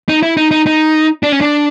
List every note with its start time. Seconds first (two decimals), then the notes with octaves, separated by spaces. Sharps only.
0.09 D#4
0.23 E4
0.37 D#4
0.51 D#4
0.66 D#4
1.23 D4
1.32 C#4
1.41 D4